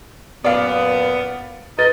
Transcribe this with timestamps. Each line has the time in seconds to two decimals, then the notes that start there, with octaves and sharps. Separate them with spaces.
0.44 F#2 A#2 B3 D5 F5
1.79 D#4 B4 D#5 A6